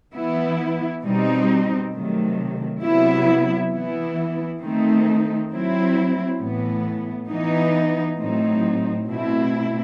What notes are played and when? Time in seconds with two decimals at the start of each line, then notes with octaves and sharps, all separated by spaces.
0.14 E3 B3 E4
1.03 B2 G3 C4 D#4
1.93 C3 D#3 F#3 A3
2.82 C3 F#3 B3 E4
3.72 E3 B3 E4
4.61 D#3 A3 C4 D#4
5.50 F#3 C4 E4
6.40 A2 E3 B3
7.29 E3 B3 D#4
8.19 A2 F#3 C4 D#4
9.08 B2 A3 C4 E4